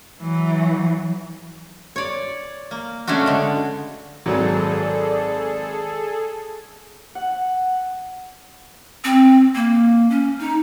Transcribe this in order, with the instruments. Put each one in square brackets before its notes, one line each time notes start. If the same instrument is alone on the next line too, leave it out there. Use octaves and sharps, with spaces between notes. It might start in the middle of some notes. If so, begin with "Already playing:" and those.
[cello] E3 F#3
[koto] C#5 D5
A#3
C#3 A3 C#4 D4 F#4
D3 G#3
[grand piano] G#1 F#3 [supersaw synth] G#4 A4 [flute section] D5
[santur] F#5
[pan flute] C4
A#3
C#4
D#4